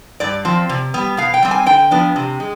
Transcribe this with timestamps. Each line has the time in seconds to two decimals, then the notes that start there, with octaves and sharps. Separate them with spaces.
0.20 G2 D5
0.45 F3 C4
0.69 C3
0.94 G3 B3
1.17 B2 F5
1.34 G5
1.43 G3 C4
1.51 G#5
1.66 D3 G5
1.91 F3 B3 D4
2.16 C3
2.40 G#3